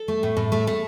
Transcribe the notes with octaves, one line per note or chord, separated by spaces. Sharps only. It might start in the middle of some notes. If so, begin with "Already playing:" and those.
Already playing: A4
A3
A2
A2
A3
A3